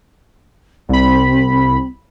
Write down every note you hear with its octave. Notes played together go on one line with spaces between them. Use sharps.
C2 C4 B5